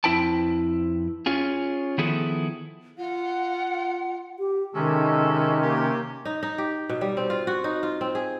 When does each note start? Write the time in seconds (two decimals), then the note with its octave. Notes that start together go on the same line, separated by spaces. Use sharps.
0.04 F2 C4 E4 B4 G5 A5
1.26 C#4 F4 G#4
1.98 D#3 F3 B3 E4 G#4 A4
2.98 F4 F#5
4.39 G4
4.74 C3 D#3 G#3 C#4 A4
5.63 A#3 G4
6.25 D#4
6.43 D#4
6.58 G4
6.89 B2
7.01 G3
7.17 C4
7.30 F4
7.47 F#4
7.64 D#4
7.83 F4
8.01 C4
8.15 G#4